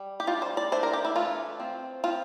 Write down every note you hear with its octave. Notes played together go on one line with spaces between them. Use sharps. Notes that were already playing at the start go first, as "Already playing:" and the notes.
Already playing: G3
G4
G3 D4 F4
C5
D5
E3 A3 D4 C5
A#4
G4
E4
E3 A3 D4 F4
F3 C4
F3 C4 F4